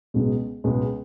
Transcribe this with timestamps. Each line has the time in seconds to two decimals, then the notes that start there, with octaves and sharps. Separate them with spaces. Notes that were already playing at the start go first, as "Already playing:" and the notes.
0.14 C#2 B2 G#3 B3
0.64 C#2 B2 G#3 B3